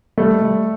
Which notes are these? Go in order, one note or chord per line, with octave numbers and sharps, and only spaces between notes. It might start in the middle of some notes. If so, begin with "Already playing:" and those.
G3 A3
G3